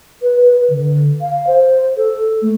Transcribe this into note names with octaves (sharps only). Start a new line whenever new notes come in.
B4
B4
D3
F5
C5
A4
A3